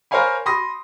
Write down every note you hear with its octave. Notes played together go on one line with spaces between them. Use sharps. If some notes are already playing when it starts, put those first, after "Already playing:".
A#4 C5 C#5 F5 G#5 B5
B5 C6 D#6 A#6